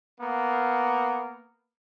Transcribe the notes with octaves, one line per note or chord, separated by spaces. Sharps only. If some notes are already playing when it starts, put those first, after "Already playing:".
A#3 B3